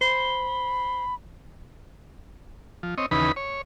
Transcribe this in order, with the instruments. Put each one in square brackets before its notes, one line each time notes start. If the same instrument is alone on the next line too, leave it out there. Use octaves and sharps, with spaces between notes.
[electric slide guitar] C5 [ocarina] B5
[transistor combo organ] F3
C4 C#5 D#5
D#2 C#3 E3 D#4 B4 B5
C#5